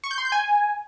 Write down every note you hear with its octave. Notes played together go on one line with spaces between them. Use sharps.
C#6
G6
C6
G6
G#5